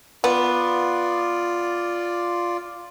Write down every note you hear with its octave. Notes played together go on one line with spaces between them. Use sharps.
B3 F4 D5